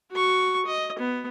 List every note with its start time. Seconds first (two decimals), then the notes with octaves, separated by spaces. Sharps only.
0.12 F#4 C#6
0.66 D#5
0.99 B3